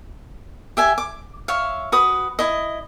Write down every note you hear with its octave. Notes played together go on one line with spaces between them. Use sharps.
G4 E5 G#5
D6
C#5 E5 F5
F#4 B4 D#6
E4 D#5